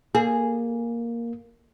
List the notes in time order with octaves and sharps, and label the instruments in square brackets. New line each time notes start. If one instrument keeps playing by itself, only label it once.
[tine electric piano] A#3 [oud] G#4